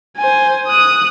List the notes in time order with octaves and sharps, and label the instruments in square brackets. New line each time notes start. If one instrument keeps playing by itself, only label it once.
[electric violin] C5 G#5
D#6 F#6